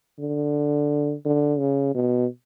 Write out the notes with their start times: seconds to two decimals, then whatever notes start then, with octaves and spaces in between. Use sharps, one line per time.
0.19 D3
1.25 D3
1.59 C#3
1.94 B2